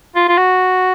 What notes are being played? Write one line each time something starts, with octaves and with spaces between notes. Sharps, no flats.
F4
F4
F#4